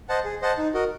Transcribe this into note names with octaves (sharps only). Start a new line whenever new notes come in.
C5 D#5 F#5 A5
G#4
C5 D#5 F#5 A5
D#4
F#4 A#4 D#5